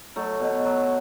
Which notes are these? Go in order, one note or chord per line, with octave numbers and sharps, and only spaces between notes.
F#3 A3
B2
F#3